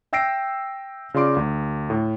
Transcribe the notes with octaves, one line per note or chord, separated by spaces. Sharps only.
E5 G5 E6 A#6 C7 D7
C#3 F4 D5 C6 D6 D7
D2
A2